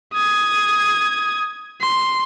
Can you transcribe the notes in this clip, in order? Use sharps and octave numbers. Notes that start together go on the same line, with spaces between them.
D#6 G#6
C6